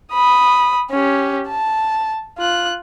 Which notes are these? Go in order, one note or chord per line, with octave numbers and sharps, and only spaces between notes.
B5 D#6
C#4 G4
A5
F4 F#6